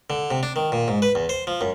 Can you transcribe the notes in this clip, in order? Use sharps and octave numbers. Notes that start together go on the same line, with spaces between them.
D3
C3
D4
D#3
A#2
G#2
B4
E2
C5
F3
F#2